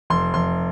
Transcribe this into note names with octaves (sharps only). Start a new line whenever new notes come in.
F1 C6
F1 C6